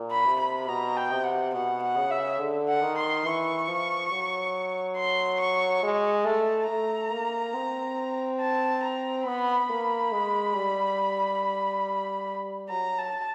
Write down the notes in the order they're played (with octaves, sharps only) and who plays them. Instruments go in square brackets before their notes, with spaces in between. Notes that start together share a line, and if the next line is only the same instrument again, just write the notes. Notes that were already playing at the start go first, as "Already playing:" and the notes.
Already playing: [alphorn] A#2
[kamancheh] B5
[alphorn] C3
[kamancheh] B5
[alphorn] B2 [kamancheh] A#5
[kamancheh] G5
[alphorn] C3
[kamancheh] F#5
[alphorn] B2 [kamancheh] F#5
[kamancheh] F#5
[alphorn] C#3
[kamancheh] E5
[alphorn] D3
[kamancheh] F#5
[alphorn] D#3
[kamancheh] C6
[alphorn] E3 [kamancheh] C#6
[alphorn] F3
F#3
[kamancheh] C6
C#6
[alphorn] G#3
[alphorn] A3 [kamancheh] A5
[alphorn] A3 [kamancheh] A#5
[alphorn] A#3
C4
[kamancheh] A5
A#5
[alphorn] B3 [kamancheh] B5
[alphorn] A#3
G#3
G3
[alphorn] F#3 [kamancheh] A#5
[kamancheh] A5